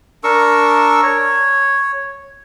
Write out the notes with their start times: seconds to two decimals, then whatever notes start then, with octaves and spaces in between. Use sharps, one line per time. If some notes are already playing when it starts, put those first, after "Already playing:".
0.24 D4 A#4 C#6 E6
1.03 C#5